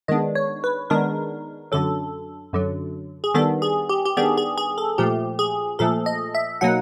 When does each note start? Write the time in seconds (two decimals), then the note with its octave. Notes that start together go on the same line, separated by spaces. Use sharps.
0.08 D#3 G#3 B3 D4 D#5
0.35 C#5
0.64 B4
0.90 D#3 G#3 B3 D4 A#4
1.72 F#2 D3 F#3 A4
2.53 F#2 D3 F#3
3.24 G#4
3.34 D#3 G3 B3 D4 A4
3.62 G#4
3.89 G4
4.05 G4
4.17 D#3 G3 B3 D4 G#4
4.37 G#4
4.58 G#4
4.78 A4
4.98 A#2 F3 A3 G4
5.39 G#4
5.79 A#2 F3 A3 A4
6.06 D#5
6.35 E5
6.61 B2 F#3 A#3 D#4 F#5